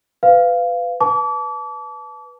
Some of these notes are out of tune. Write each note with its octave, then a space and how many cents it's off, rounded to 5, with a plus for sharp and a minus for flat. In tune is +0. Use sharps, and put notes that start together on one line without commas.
B4 +25 F5 -10
B4 +0 A5 -20 D6 -35